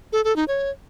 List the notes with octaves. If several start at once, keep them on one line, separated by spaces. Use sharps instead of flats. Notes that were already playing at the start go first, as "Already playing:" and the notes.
A4
A4
D#4
C#5